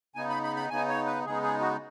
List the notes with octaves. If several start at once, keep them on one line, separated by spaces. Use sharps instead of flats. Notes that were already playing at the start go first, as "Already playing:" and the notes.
C#3 B3 D#4 G#5
B5
B5
B5
C#3 B3 D#4 G#5
C#5
B4
C#3 G#3 B3 D#4 G#4
G#4
F#4